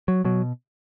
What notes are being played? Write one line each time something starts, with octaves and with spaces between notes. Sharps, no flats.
F#3
B2 F#3